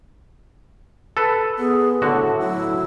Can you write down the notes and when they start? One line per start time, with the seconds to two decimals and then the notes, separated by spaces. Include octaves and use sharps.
1.17 A4 B4
1.59 B3 G#4
2.02 A2 D3 F#4 A4
2.40 F#3 E4